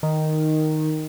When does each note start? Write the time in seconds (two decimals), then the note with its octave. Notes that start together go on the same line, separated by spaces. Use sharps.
0.03 D#3